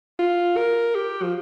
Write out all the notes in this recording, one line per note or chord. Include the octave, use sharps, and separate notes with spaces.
F4
A#4
G4
F3